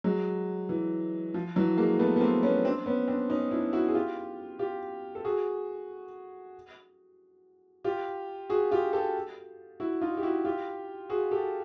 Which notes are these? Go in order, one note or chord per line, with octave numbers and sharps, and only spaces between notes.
F#3 G#3
E3
F3
E3 F#3
G#3 A#3
A3 B3
B3
A#3 C4
B3 C#4
C4 D4
B3 C#4
C4 D4
C#4 D#4
D4 E4
E4 F#4
G#4
F4 G4
F4 G4
A4
F#4 G#4
F4 G4
F#4 G#4
F4 G4
G4 A4
E4 F#4
D#4 F4
G4
E4 F#4
F4 G4
F#4 G#4
G4 A4